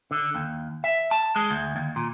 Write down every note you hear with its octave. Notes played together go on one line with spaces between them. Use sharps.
D3
D#2
E5
A5
G#3
D2
D#2
A#2